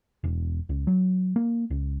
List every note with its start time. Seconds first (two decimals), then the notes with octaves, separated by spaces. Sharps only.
0.24 E1
0.69 C#2
0.87 F#3
1.36 A#3
1.70 C#2